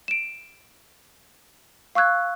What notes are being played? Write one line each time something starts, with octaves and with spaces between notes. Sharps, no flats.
D7 E7
F5 C#6 E6 F#6 G#6